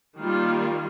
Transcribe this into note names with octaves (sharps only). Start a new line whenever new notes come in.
D#3 G3 A#3 F4